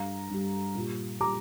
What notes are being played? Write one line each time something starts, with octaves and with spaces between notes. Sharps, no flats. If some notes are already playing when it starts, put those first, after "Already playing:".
Already playing: G2 G3 F5 A#5
G2 G3
A#2 G3
A#2 G3 A#5 D6